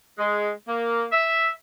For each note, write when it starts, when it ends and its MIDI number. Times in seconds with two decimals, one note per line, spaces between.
0.18 0.50 56
0.67 1.05 58
1.12 1.49 76